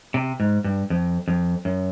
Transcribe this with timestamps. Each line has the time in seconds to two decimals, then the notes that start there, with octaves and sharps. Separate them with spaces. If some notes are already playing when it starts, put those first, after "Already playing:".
0.14 C3
0.40 G#2
0.64 G2
0.90 F2
1.28 F2
1.65 F#2